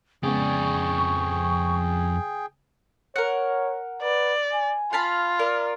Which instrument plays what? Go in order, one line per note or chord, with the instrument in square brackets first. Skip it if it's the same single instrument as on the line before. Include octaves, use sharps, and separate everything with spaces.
[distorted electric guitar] F2 D5 [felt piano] C#3 G#3 B3 [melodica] G#4 G5 [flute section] C#6
[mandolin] A#4 F#5 [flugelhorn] C#5
[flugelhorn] B4 [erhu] D5
[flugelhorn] G#5
[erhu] F4 [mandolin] F5 A5 B5
[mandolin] A#4 [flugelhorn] D5